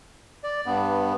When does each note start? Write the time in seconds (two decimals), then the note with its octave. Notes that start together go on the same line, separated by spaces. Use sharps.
0.44 D5
0.66 G2 B3